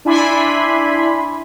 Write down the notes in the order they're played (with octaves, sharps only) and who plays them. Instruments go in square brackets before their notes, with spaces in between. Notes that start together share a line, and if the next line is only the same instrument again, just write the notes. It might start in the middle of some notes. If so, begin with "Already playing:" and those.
[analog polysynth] D4 E4 G#5 B5 C6